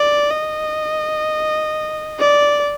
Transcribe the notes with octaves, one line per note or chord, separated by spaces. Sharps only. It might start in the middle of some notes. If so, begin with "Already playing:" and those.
Already playing: D5
D#5
D5